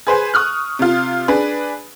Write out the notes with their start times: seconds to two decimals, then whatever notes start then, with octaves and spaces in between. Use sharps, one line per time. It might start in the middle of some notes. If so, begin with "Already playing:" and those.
0.07 G#4 B4 C5 G#5
0.34 C#6 D#6 F6 F#6
0.79 C3 F4
1.28 D4 G#4 B4